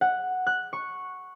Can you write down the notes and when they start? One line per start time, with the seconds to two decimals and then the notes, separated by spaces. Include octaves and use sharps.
0.01 F#5
0.47 F#6
0.73 C#6